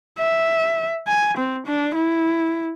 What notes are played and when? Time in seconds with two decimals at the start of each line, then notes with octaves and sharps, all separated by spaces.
0.19 E5
1.08 G#5
1.37 C4
1.66 D4
1.95 E4